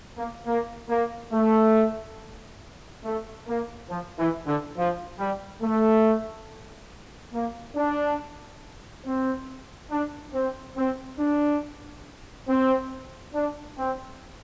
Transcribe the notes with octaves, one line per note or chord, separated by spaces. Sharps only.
A#3
A#3
A#3
A3
A3
A#3
F3
E3
D3
F3
G3
A3
A#3
D4
C4
D4
C4
C4
D4
C4
D4
C4